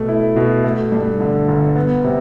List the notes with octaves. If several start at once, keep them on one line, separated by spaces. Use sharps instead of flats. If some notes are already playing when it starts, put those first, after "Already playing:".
Already playing: B2 A3
E4
B2
A3
G2
D3
G1
B3
C3